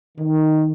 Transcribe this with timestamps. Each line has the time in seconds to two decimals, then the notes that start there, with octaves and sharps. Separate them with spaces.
0.18 D#3